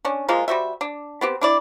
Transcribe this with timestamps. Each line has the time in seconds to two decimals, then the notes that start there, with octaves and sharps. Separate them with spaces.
0.05 C#4 D4
0.29 F3 G#3 A#3 F4
0.48 G3 F#4 C5 E5
0.81 D4
1.21 B3 C4 G4
1.41 D4 E4 D5